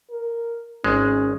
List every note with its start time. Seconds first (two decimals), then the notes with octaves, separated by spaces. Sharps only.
0.10 A#4
0.84 G#1 G#3 C#4